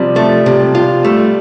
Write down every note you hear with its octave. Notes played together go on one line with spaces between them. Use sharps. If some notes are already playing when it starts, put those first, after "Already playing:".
Already playing: C3 F3 G3
F3 A3
C3
G3
F4
G3 A3